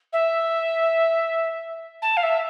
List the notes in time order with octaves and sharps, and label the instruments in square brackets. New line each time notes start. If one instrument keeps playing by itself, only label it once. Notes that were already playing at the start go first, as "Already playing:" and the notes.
[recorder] E5
A5
F5
E5